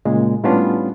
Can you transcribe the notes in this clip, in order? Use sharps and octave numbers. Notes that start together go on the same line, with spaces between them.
A#2 C#3 G#3
A2 G3 B3 C#4 D4 F4